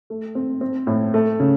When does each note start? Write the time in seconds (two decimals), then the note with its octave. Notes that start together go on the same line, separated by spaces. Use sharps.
0.10 A3
0.35 C4
0.61 C4
0.87 A2
1.14 A3
1.40 C#3